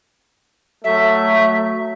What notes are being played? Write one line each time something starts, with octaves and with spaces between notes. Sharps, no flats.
F#3 A3 E5